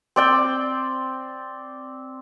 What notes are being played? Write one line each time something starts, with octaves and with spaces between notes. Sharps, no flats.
C4 D5 G5